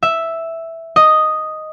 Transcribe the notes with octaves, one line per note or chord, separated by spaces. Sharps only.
E5
D#5